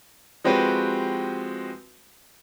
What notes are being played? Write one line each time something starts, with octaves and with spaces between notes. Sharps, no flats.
F3 G#3 C4 F#4 G4 B4